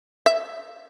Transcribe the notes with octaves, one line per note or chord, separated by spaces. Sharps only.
E5